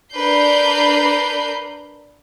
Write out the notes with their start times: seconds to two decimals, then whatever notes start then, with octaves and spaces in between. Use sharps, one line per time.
0.13 D4 A#4 B4 G6 C7